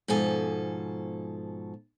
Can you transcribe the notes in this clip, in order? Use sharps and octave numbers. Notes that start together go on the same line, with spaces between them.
G#2 B2 F3 A4 G#5